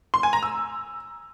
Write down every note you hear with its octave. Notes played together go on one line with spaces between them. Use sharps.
C6
G#5
A#5
E6